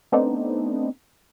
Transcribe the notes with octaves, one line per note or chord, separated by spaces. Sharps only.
A3 B3 C4 D4 D#4